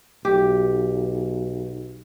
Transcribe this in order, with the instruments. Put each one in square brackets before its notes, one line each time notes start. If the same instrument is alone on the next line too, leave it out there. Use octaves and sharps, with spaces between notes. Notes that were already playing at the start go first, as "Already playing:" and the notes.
[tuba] B1 [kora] G4